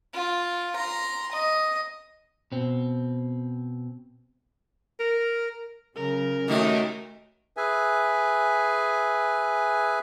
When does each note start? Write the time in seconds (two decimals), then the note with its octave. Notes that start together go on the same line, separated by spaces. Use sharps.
0.14 F4
0.76 A#5 C6
1.32 D#5
2.52 B2 C4
4.99 A#4
5.96 C#3 F#3 A#4
6.48 D#2 D#3 A3 F#4 G4
7.57 G#4 B4 E5 G#5